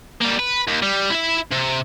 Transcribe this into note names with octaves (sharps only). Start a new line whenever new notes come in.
G3 A#3
B4
D#2
G3
E4 E5
C3